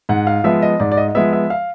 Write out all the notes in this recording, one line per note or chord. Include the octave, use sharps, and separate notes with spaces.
G#2 F#5
F5
F3 G#3 B3 E5
D#5
G#2 D5
D5
D#5
D#5
F3 G#3 B3 E5
E5
F5